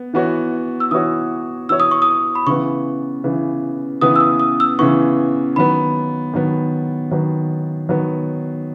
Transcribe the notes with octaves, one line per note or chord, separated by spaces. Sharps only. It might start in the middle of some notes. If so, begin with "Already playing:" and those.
Already playing: B3
E3 B3 F#4 C#5
E6
E3 B3 F#4 C#5 D#6
E3 B3 F#4 C#5 E6
D#6
C#6
D#6
B5
C#3 E3 B3 C#6
C#3 E3 B3
C#3 E3 B3 D#6
E6
D#6
D#6
E6
C#3 E3 B3 C#6
D#3 F#3 B3 B5
D#3 F#3 B3
D#3 F#3 B3
D#3 F#3 B3